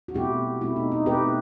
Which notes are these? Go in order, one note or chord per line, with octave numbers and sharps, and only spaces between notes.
F#4
B2 A3 C4 E4 G4
B2 A3 C4 E4
D#4
D#4
B2 A3 C4 G4 B4